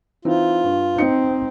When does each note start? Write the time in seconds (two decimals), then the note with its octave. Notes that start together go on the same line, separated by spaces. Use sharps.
0.25 E3 C4 D#4 F4
0.64 G2
0.98 C4 D#4 D#5 C#7